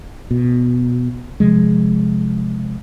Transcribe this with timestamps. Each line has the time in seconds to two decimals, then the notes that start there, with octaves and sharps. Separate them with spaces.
0.31 B2
1.40 C3 F3 G#3